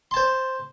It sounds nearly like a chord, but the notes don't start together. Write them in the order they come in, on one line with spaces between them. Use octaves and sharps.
C6 A5 C5